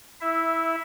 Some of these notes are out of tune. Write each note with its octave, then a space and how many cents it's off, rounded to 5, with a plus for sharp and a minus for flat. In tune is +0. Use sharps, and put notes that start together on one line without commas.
E4 -15 E5 +0